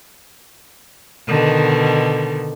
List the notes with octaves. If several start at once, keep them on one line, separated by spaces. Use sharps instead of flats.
B2 D3 D#3